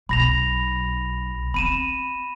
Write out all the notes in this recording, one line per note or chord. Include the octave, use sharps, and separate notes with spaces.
B1 B5 A#6 F7
C4 B5 D#7 E7